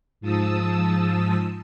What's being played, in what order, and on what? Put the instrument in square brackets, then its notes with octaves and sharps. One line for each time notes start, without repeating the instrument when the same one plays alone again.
[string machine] G#2 F3 A5 D#6 E6